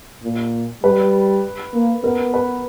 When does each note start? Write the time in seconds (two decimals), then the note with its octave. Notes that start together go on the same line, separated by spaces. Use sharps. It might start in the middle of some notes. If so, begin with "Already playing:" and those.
0.23 A#2
0.84 G3 B4
1.73 A#3
2.04 B3 A#4
2.34 B4